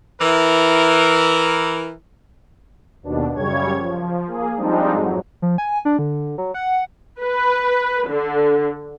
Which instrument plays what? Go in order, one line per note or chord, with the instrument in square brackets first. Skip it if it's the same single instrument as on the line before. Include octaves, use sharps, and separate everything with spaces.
[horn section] E3 A#4
[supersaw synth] D#2 B2 D4
F#2 C#3 G3 C#5 G#6
F3
A#3 G#4
F3 G3 G#3 C4 D4 D#4
F2 G#2 F#3
[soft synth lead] F3
G#5
D4
D3
F#3
F#5
[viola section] B4
D3